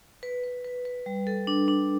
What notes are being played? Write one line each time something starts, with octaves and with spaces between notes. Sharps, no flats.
B4
B4
B4
B4
G3
A4
D4
D4